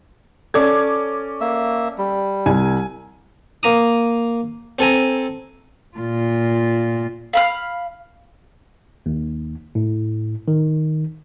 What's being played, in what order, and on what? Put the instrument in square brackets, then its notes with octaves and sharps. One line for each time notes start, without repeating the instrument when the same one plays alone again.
[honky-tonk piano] C#4 D6 G#6 [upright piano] A4 D5
[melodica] A#3 E5
G3
[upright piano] C2 [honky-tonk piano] G#5
[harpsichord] A#3 A#5 D#6
C4 A4 G#5 A#5
[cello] A#2 F4
[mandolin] F5 B5 F6
[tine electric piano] D#2
A2
D#3